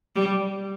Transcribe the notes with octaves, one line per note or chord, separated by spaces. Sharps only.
G3